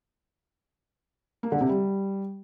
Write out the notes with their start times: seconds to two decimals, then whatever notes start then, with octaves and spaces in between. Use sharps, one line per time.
1.43 A#3
1.52 D3
1.61 C3
1.69 G3